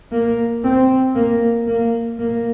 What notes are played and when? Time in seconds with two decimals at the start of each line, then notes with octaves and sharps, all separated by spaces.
0.12 A#3
0.64 C4
1.15 A#3
1.67 A#3
2.19 A#3